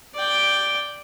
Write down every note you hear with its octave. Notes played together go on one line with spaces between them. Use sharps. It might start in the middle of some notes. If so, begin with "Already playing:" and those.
D5 G5